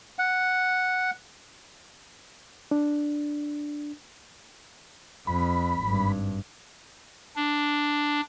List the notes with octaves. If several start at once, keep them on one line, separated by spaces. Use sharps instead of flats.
F#5
D4
F2 B5
G#1 G2
D4